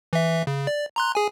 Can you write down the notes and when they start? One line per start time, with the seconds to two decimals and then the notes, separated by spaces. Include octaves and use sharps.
0.13 E3 E5
0.47 C#3
0.67 D5
0.96 A#5 C6 F#6
1.15 G#4 G#5